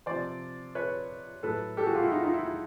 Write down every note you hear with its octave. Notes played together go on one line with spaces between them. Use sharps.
C3 F3 C5 D5
B4 C#5
A2 F#3 A4 B4
G4 A4
F#4 G#4
F4 G4
E4 F#4
D#4 F4
D#4 F4
E4
E4